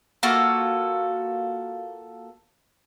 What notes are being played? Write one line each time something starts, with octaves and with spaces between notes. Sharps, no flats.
A#3 F4 F#4 A4